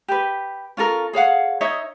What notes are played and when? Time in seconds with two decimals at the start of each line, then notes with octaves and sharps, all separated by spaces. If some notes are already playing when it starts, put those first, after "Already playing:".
0.08 G4 B4
0.77 C#4 F4 A4 A#4
1.13 G#4 C#5 F5 F#5
1.61 D#4 C#5 D#5 E5